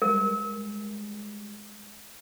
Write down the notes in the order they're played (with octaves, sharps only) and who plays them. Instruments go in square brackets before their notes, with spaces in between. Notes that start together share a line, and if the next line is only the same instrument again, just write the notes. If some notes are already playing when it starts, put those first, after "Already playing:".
[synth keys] G3 G#3 [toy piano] A#4